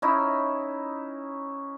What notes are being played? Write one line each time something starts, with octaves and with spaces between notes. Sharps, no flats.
C#4 D#4 E4